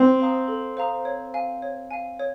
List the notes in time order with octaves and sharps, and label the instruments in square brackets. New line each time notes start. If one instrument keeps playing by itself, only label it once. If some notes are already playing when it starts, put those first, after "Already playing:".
Already playing: [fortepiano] C4
[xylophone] C5 F5 A#5 D#6
A4
C5 F5 A#5 D#6
C#5
F5 G#5
C#5
F5 G#5
C#5